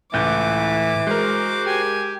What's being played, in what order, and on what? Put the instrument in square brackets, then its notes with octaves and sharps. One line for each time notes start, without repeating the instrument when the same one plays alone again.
[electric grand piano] C#2 F#6 G6 [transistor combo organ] A2 [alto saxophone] E3 [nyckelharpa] D6
[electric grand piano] G#3 A#4 [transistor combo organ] F#4 C5
[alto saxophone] G4 [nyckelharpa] G#5